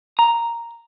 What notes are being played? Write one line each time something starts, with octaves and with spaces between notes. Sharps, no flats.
A#5